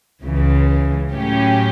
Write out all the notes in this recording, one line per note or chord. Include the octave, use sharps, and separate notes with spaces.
C#2 C#3 E3
A2 F#3 C#4 G4